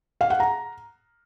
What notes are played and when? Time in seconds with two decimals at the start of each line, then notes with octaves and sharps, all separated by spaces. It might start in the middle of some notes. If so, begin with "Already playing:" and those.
0.21 F5
0.30 F#5
0.40 A#5